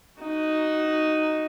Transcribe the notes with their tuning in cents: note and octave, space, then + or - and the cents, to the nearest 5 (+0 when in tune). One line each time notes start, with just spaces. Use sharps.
D#4 +0 F#4 +15